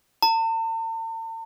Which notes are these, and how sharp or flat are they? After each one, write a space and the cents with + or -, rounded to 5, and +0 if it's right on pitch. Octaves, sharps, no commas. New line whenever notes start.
A5 +45